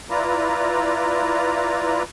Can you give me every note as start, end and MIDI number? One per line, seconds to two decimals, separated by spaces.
0.10 2.03 64
0.10 2.03 65
0.10 2.03 71
0.10 2.03 74
0.10 2.03 82